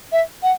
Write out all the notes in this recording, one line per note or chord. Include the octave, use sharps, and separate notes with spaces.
E5
F#5